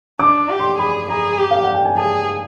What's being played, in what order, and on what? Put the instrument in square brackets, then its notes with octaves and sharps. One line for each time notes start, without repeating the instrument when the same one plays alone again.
[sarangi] D4 [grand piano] D6
[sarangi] G4
[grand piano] C6
[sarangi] G#4 [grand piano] B5
[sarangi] G#4 [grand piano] A#5
[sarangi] G4
[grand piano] F5
F#5
G5
G#5
[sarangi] G#4 [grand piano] A5